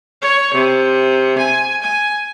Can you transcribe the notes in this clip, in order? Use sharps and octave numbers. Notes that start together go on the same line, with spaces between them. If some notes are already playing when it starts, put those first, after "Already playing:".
C#5
C3
G#5
G#5